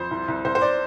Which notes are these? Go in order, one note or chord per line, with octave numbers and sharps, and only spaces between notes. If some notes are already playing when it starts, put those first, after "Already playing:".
Already playing: F2 C5
C2
C2
C2 C5
C5
D5